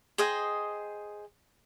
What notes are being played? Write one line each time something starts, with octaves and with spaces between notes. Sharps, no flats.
G#4 C5 D#5 G5